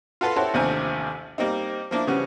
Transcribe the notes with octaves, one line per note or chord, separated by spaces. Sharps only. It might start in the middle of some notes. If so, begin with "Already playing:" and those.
F4 F#4 A4 B4 C6
E4 F#4 G4 A4 C5 C#5
A1 D#2 C3 F3 D4 G#5
G3 A#3 C4 D#4
F3 A#3 D4 E4
C#3 E3 F3 G3 C#4 F#4